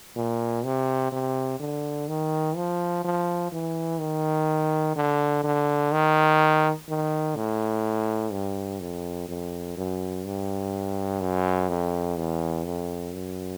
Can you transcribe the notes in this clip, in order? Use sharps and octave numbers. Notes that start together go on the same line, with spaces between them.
A#2
C3
C3
D3
D#3
F3
F3
E3
D#3
D3
D3
D#3
D#3
A2
G2
F2
F2
F#2
G2
F#2
F2
E2
F2
F#2